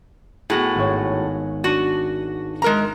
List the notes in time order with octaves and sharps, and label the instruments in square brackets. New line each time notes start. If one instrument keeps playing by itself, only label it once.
[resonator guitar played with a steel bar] A2 F#4 [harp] B3 G#4
[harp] G#1 C#5
[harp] D4 C#7 D#7 [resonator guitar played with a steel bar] F#4
[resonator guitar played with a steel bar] G#3 A#4 A#5